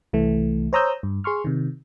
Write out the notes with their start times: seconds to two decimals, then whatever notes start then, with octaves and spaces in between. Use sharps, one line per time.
0.13 C2 E3 A3
0.73 C5 C#5 A#5 D#6 E6 G6
1.03 G2
1.24 G#4 C6 C#6 F6
1.45 C3 D#3